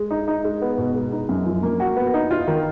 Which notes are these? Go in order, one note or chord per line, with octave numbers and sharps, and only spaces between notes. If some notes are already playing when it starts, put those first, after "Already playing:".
Already playing: G#3
D#4
D#4
G#3
B3
B2
G#3
D#4
F#2
F3
A#3
F#4
B3
D#4
F4
D#3